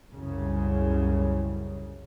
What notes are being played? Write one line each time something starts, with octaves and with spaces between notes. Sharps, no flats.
C2 F#2 C#3